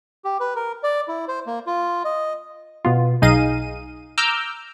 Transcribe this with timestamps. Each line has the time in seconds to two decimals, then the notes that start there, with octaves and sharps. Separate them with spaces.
0.25 G4
0.40 B4
0.56 A#4
0.83 D5
1.08 E4
1.28 C5
1.47 A#3
1.67 F4
2.05 D#5
2.85 B2 B3 F4
3.22 B1 D#4 G#4 D#5 F5 D#7
4.18 A#5 D6 E6 F6 G6